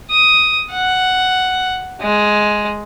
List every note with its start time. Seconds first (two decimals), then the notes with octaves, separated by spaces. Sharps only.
0.10 D#6
0.71 F#5
2.01 G#3